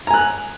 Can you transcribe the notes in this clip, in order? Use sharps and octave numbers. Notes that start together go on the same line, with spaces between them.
G#5 A#5 F#6